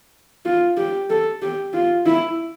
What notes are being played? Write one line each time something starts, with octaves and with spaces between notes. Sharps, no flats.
F4
G4
A4
G4
F4
E4